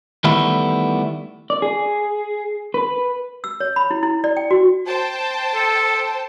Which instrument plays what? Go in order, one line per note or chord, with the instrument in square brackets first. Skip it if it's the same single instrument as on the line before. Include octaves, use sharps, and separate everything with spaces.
[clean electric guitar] D#3 E3 G3 A3 B3 E4
[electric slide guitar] D5
G#4
B4
[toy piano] E6
C#5
B5
E4
E4
D5
G5
F#4
[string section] C5 G5 A5
[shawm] A4